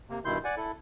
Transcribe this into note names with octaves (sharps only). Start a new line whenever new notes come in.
C3 A#3
G2 B2 D#3 E4 C6 G6
D5 F#5 G#5
E4 A4